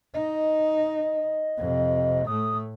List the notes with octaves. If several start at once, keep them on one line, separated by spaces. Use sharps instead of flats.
D#4 D#5
F2 C3
A2 A3 D#6